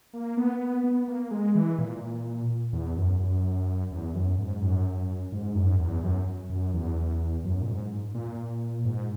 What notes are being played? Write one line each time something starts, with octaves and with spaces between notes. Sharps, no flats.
A#3
B3
B3
B3
A#3
G#3
E3
A#2
E2
F#2
F#2
E2
F#2
G#2
F#2
G#2
F#2
E2
F#2
F#2
E2
F#2
A#2
G#2
A#2
G#2